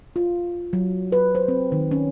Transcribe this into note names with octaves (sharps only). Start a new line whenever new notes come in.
F4
F#3
B4
C5
C4
D#3
C#4